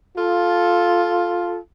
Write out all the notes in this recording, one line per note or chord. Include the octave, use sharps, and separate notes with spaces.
F4 A4